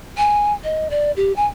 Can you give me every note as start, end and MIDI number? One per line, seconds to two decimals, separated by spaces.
0.18 0.53 80
0.64 0.88 75
0.90 1.11 74
1.16 1.33 67
1.36 1.46 80